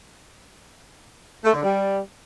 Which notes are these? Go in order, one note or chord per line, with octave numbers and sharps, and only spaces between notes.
A3
D3
G3